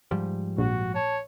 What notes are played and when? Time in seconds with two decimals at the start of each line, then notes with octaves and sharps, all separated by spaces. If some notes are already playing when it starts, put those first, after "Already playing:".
0.11 G#2 F3 G3
0.58 A#1 F#4
0.95 C#5 A5